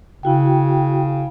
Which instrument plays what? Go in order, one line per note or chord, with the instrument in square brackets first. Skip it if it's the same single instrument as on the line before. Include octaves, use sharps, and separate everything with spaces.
[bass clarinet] C#3 [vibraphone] E4 F#4 G5